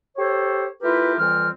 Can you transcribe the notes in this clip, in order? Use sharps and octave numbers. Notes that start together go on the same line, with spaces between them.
G4 A4 C5 C#5
A3 E4 F4 G4 A#4 B4
F2 E3 G3 C4 F6